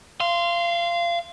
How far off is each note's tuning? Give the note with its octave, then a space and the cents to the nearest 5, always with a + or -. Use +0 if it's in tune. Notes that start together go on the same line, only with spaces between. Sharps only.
F5 -25 C6 +0